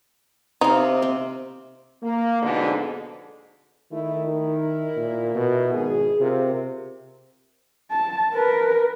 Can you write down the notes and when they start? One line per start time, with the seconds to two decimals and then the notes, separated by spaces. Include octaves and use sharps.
0.61 C3 D#4 F5
1.02 C4
2.03 A#3
2.43 F2 G#2 B2 D3
3.91 D#3 A3 D#4 E4
4.27 E4 A#4
4.96 A#2
5.35 B2
5.74 G#1 G#4
6.21 C3 F4 A#4
7.91 A5
8.33 A#4 B4